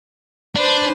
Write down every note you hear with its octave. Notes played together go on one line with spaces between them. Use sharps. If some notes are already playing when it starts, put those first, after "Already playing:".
D4 B4 C5